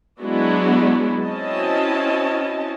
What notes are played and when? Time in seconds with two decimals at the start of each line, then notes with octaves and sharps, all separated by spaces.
0.21 F#3 G#3 B3 D4 E4 F#4
1.24 C4 C#4 E4 F#4 D#5 A5